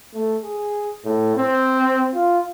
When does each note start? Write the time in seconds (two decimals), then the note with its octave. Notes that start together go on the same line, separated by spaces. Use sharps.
0.14 A3
0.43 G#4
1.04 A2
1.36 C4
2.14 F4